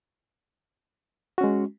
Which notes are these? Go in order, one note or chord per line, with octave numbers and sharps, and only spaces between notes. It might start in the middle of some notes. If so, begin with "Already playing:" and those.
G#3 C#4 F#4